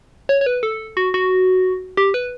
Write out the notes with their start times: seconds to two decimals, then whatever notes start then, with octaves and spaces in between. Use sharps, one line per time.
0.29 C#5
0.41 C#5
0.46 B4
0.63 A4
0.97 F#4
1.14 F#4
1.97 G4
2.14 B4